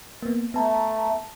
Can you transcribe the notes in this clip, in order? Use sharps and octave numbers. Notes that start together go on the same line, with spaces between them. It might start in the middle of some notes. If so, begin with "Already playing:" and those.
A#3 B3
A3 B3 A5 A#5